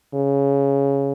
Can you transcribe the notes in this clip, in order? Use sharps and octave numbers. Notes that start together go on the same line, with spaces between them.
C#3